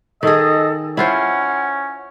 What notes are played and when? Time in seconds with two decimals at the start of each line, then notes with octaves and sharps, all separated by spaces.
0.23 D#3 G#4 A4 D#5
0.97 C#4 E4 F4 C5 F#5